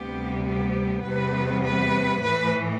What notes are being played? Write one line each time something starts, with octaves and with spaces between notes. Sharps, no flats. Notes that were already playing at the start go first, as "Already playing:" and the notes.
Already playing: D2 C3 G3 B3 G4
G4
E2 C3 G3 B3 B4
B4
A2 E3 A3 B4